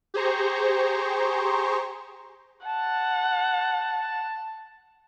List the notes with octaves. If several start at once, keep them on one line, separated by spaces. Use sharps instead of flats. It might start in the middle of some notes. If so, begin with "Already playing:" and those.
G4 G#4 C5 A#5 C#6
F#5 A5